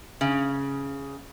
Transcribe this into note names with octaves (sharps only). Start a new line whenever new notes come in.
C#3